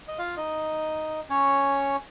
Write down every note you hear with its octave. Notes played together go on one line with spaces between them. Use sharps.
D#5
F4 F5
D#4 D#5
C#4 C#5